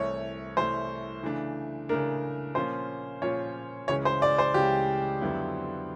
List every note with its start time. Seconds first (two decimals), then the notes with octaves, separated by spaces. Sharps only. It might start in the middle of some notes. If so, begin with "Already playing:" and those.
Already playing: C2 C3 E3 A3 C#5
0.57 C2 C3 E3 A3 C5
1.23 C#3 E3 A3 D4
1.89 C#3 E3 A3 D4 A#4
2.55 A#2 F3 A#3 C#4 F4 C5
3.22 A#2 F3 A#3 C#4 F4 C#5
3.88 C#2 C#3 E3 G#3 C#4 C#5
4.05 C5
4.22 D5
4.38 C5
4.54 C#2 C#3 E3 G#3 C#4 G4
5.21 F2 D3 F#3 B3 E4